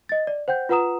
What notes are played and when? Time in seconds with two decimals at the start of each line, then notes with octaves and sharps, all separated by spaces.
0.09 D#5 A6
0.27 D5
0.48 C5 F#5 G5 G6
0.69 F4 B4 F#5 A#5 D#6 E7